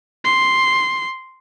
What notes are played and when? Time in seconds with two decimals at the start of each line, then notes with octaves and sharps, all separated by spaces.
0.24 C6